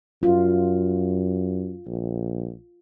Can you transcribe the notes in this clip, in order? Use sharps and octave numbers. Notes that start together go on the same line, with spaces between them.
F#2 F4
A#1